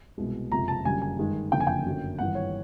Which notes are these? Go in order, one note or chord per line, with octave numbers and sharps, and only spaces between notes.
C2 B2 G#3
F#1 F2 C3 F3 G#3 A#5
A5
F#1 F#2 D3 G3 G#5
G#5
G2 D#3 G#3
F#1 F2 D3 F3 G5
G#5
G5
G1 F#2 D3 F#3
G#1 G2 E3 F#5
C#5